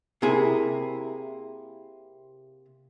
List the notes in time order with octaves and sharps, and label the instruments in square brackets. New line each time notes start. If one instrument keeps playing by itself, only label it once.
[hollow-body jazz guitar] C3 A#3 E4 G#4